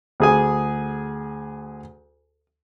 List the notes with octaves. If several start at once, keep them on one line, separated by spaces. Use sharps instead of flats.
D2 G#4 G#5